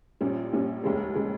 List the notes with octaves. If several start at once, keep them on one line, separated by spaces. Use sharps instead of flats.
A#1 A#2 G3 C#4
A#1 A#2 G3 C#4
F1 D#2 C#3 G#3
C#3 G#3